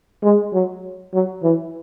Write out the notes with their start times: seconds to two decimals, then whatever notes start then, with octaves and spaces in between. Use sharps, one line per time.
0.23 G#3
0.53 F#3
1.14 F#3
1.44 E3